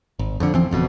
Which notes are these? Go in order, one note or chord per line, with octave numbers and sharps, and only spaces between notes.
G#1
F2 D3
E3 F3 C4
F#1 F2 B2